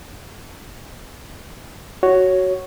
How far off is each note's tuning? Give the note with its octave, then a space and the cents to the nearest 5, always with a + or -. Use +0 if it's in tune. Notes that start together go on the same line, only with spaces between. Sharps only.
F#4 +10 C#5 +0